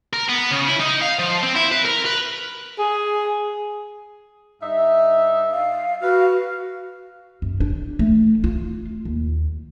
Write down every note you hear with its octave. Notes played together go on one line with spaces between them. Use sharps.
A#4
B3
C#3
E4
D#4
F5
F3
C4
E4
B4
A#4
B4
G#4
G2 D#4 E5
F5
F#4 B4 F5
F#2
D4
A3
F4
D#2